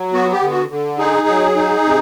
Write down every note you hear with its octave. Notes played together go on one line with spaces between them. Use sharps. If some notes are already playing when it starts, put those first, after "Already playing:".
Already playing: F#3
B3 F#4
G4
D3
F#4
D3
D#4 G#4
F#3
D#4
C3